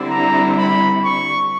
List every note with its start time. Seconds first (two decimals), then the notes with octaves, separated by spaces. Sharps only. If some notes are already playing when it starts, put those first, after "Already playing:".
Already playing: D3 G3 C4 E4
0.09 A#5
0.57 B5
1.04 C#6